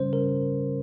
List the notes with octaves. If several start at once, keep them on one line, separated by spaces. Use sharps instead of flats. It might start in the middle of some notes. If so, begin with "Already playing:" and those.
Already playing: C#3 G3 C#4 C5
A#4